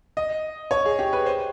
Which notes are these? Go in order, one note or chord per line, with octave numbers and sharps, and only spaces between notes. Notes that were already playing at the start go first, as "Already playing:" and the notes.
D#5
C#5
G#4
G4
B4
C5